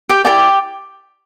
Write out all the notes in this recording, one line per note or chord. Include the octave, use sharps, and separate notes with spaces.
G4 G5
E4 G4 A4 D5 G5